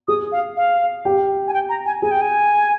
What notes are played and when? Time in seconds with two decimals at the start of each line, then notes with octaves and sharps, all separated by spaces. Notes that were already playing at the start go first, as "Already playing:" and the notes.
0.08 G#4 D#6
0.32 F5
0.57 F5
1.05 G4
1.48 G#5
1.54 G5
1.69 A#5
1.86 G#5
2.02 G#4 G#5
2.11 G5
2.21 G#5